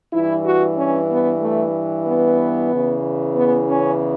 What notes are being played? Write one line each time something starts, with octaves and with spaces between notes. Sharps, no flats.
G2 E3 E4
F#4
C#4
B3
A3
B3
E2 C#3 E3
B3
C#4